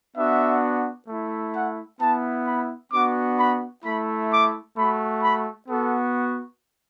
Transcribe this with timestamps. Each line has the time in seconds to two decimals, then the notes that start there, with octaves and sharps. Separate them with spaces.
0.16 B3 D4 F#4 E5
1.08 A3 E4
1.54 F#5
2.00 B3 E4 A5
2.46 B5
2.92 B3 D4 F#4 D6
3.38 B5
3.84 A3 E4 B5
4.31 D6
4.76 A3 F#4 B5
5.22 B5
5.68 B3 F#4 A4